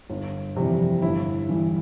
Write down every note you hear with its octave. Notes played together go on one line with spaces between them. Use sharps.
G1
F2 C3 E3 G3
G1 E4
G2 E3